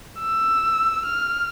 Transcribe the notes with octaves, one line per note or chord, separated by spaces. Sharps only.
E6
F6